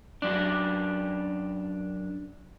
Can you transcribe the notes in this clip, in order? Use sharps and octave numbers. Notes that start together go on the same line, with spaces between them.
F#2 D4